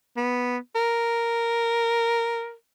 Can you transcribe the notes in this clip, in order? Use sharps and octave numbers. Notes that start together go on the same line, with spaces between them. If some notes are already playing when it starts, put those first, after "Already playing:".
B3
A#4